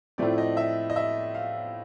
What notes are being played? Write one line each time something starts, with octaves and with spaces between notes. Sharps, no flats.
A2 F3 A3 C4 D5
D#5
E5
D#5
E5
F5